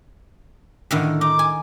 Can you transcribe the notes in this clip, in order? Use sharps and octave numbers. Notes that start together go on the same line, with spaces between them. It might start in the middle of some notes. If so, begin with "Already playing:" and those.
A2 D3 D#3
D#4 D6
G#5